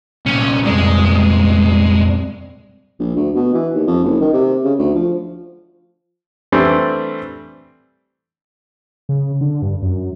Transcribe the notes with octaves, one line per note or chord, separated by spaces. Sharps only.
C2 A#2 C#4
F2 G3 G#3
A#1
D2
B2
E3
D#2
F2
F#1
D#3
C3
C#3
D2
F3
E3 G3 A3 C4 D4
C#3
D3
G2
F#2